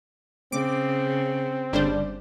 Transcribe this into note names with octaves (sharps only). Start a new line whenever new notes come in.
C#3 C4 D6
G1 C#3 G3 D4 C5